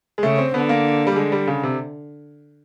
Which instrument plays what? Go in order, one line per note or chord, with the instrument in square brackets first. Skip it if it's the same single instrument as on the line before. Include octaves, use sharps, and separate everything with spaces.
[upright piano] G#3
[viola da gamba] C#3 [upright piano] A3
[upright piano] C4
[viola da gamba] D3 [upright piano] B3
[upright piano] A#3
G3
[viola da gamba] D3 [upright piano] G#3
[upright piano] G3
C#3
C3